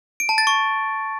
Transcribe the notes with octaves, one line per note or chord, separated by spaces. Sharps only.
D7
A5
A6
C#6